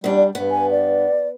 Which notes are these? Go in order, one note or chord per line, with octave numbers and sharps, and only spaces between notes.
E2 G3 D4
G2 B3
G#5
D5